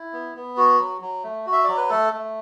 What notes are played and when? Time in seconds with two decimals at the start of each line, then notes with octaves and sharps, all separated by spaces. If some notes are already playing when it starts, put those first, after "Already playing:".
Already playing: E4
0.13 B3
0.36 B3
0.57 F#4
0.80 F#3
1.01 F#3
1.24 A3
1.46 F#4
1.52 E5
1.64 F#3 D5
1.77 B4
1.90 A3 A4
2.13 A3